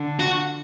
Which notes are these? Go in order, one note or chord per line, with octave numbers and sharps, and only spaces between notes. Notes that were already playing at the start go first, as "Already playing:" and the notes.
Already playing: D3
F#4